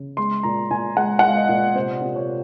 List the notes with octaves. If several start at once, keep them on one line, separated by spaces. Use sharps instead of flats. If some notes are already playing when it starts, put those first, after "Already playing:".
Already playing: C#3
G#3 C6
A#2 A#5
A#2 G#5
G#3 F#5
G#3 F#5
F5
D#5
A#2
C3 C5
C3
C#5